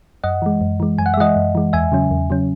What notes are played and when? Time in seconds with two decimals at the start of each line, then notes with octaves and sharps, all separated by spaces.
0.24 F#2 D#5 F#5
0.42 E3 G#3
0.61 F#2
0.80 E3 G#3
0.98 F#2 G#5
1.06 F#5
1.14 E5
1.17 E3 G#3 D#5 F#5
1.36 F#2
1.55 E3 G#3
1.73 E2 E5 G#5
1.92 C#3 F#3 C#4
2.11 E2
2.30 C#3 F#3 C#4